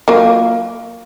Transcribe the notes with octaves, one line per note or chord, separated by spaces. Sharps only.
F#3 A#3 F4